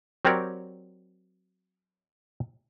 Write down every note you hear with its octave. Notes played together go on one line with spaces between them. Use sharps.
F#3 C4 G4 A#4 C#5 D5